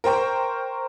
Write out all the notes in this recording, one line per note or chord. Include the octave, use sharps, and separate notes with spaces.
A#4 C5 G5 C#6